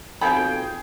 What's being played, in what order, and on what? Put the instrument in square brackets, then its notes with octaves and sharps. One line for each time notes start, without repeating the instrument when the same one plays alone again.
[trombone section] B1 F2 [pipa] A#3 A4 B5 [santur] G#4 [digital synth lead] G5